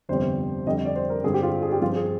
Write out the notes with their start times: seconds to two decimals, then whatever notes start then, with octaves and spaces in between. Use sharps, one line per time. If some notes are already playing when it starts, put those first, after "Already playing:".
0.09 G1 F2 C3 G3 C5
0.67 F2 D3 G3 D#5
0.85 D5
0.96 C5
1.10 A#4
1.24 G2 D3 G#3 C4 G#4
1.34 G4
1.43 F4
1.62 G#4
1.72 G4
1.81 G2 F3 C4 F4
1.95 G#4